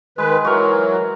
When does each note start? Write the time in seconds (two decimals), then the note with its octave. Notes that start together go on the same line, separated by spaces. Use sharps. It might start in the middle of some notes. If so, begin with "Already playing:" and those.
0.18 D#3 G#3 B4
0.44 E3 F#3 F#4 A#4